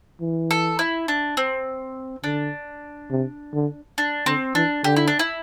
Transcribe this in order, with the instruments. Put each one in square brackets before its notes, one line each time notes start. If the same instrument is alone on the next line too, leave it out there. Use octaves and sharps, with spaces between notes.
[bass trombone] E3
[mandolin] A4
E4
D4
C4
[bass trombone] D3 [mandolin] D4
[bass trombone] C3
D3
[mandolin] D4
[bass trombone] D3 [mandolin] C4
[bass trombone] E3 [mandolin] D4
[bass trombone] D3 [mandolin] G4
[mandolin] E4
D4
E4